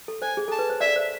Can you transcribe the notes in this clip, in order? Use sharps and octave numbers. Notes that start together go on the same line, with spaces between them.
A4
C5 G#5
G#4
A4 A5
B4
C5
D5 E5
C5